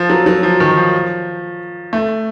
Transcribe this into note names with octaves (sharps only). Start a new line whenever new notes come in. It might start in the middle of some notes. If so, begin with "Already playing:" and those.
Already playing: F3
F#3
F#3
F3
D#3
F3
A3